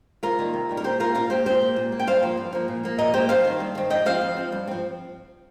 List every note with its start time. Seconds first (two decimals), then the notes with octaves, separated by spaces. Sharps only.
0.23 C3 F4 A#4
0.39 D#3 G3 A#3
0.54 C3
0.69 D#3 G3 A#3
0.77 A#4
0.84 A#2 G4 C5
1.00 A#3 F4 A#4
1.15 A#2 F4 A#4
1.30 A#3 G4 C5
1.46 A#2 G4 C5
1.61 A#3
1.76 A#2
1.92 A#3
1.99 G5
2.07 G2 C5 F5
2.23 F3 A#3
2.37 G2
2.53 F3 A#3
2.68 A#2
2.83 F3 A#3
2.98 A#2 A#4 D#5
3.14 F3 A#3 G4 C5
3.29 G2 C5 F5
3.45 D#3 C4
3.60 G2
3.75 D#3 C4
3.90 F2 D#5 G5
4.05 F3 C4 C5 F5
4.21 F2
4.36 F3 C4
4.52 G2
4.67 F3 C4